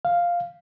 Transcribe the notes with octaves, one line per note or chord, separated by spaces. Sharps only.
F5